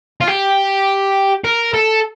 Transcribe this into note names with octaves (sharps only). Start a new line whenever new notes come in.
F4
G4
A#4
A4